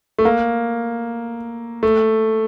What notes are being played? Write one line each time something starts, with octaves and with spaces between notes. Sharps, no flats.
A3
A#3
A3